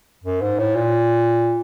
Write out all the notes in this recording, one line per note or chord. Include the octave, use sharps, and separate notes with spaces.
F#2
G#2
A2
A#2